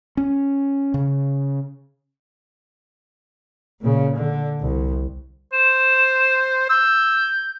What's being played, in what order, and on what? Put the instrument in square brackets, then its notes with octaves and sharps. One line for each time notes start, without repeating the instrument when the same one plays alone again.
[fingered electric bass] C#4
C#3
[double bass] A#2 C#3
D3
C2
[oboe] C5 [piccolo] E7
[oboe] E6 [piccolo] G6